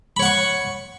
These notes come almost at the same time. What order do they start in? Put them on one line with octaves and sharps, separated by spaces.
B5 C#5 F#5 C#6